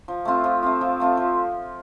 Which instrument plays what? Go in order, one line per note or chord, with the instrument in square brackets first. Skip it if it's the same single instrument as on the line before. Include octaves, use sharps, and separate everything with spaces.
[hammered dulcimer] F3
A3 C4 F4
F3
A3 C4 F4
F3
A3 C4 F4
F3